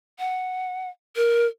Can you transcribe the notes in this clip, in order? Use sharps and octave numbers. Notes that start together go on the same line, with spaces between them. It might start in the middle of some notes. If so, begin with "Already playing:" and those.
F#5
A#4